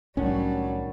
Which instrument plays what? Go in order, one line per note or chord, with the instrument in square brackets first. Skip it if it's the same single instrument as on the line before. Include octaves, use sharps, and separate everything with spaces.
[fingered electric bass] C2 A2 [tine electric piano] D#3 D4 F#5 [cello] F#3 G3 [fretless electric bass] C#4